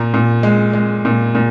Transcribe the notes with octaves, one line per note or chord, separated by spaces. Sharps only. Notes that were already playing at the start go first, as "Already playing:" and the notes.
Already playing: A#2 A#5
A#2
G#3
G#3
A#2
A#2